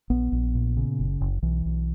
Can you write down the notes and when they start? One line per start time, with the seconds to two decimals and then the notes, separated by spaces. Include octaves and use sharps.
0.10 A#1 B3
0.32 A#1
0.55 A#2
0.77 C#3
0.99 F#1
1.21 F#1
1.42 B1 E3
1.65 B1